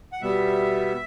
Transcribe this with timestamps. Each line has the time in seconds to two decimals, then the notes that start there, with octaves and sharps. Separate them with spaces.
0.12 F#5
0.21 B2 G3 B3 E5